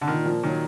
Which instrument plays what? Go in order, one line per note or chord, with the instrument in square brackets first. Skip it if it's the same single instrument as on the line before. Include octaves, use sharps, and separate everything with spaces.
[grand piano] D3
[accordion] A#2 [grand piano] D#3
[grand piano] F3
[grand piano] D#3 [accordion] F#3